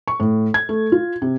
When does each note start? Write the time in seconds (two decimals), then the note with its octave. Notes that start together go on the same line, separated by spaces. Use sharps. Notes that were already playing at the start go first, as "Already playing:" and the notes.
0.08 C#6
0.20 A2
0.54 G#6
0.69 A3
0.92 F4
1.22 C3